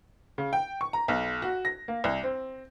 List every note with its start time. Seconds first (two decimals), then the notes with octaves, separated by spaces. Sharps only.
0.38 C#3
0.53 G5
0.81 C#6
0.93 A#5
1.08 B1
1.42 F#4
1.65 A#6
1.88 A#3
2.04 C2
2.23 C4